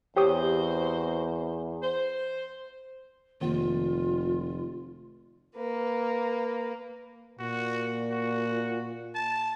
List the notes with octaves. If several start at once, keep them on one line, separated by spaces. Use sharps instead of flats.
E2 C4 F#4 G4 C5 C#5 D#6
C5
F1 D#3 A#3 F4
A#3 B4
A#2 F#4
F#4
A5